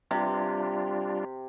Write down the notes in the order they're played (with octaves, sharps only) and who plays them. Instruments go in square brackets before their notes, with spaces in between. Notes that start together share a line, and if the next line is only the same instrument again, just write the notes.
[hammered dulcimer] C3 [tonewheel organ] G3 D4 F4